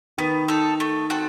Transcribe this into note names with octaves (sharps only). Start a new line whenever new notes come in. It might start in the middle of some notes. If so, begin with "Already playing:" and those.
D#3 B3
D#4 A4
A3
C4 F#4 A4